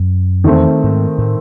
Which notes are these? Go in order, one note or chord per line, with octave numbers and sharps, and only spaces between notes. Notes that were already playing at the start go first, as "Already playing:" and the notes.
Already playing: F#2
E2 D#3 A3 C4
G#2
A2